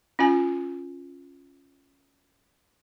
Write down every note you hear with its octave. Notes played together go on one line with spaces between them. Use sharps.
C#4 F4 G#5